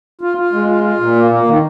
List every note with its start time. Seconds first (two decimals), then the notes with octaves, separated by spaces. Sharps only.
0.21 F4
0.37 F4
0.53 G#3
0.68 F4
0.84 F4
1.00 A#2
1.16 A#3
1.31 A#3
1.47 D#3